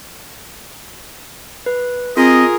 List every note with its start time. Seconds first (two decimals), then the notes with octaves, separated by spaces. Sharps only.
1.66 B4
2.17 C4 F4 G#4 A#4 D#5